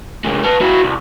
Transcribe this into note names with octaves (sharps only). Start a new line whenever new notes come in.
C3 G#3
B4 A5
E4 F#4
C2